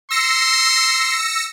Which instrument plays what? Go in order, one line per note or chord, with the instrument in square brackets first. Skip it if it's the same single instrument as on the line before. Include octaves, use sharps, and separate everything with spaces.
[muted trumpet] C6 [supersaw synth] E6 A#6 C#7